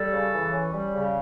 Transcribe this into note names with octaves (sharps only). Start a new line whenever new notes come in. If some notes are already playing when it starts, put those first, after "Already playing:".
Already playing: G3 A4
C#3
E3
C#4
G3
C#3